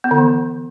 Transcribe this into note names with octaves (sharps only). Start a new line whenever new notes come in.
B3
D3
E3